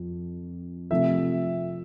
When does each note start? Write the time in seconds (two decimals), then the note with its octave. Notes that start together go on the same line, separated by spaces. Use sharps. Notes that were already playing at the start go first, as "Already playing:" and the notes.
Already playing: F2 F3
0.91 C3 F3 A3 E5